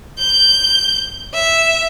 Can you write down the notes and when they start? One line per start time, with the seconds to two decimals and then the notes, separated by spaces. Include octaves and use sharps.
0.18 G6
1.34 E5